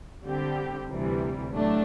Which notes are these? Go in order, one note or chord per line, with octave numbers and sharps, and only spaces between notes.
D3 G3 C4 G4
D2 C3 E3 G3
A2 F#3 A3 D4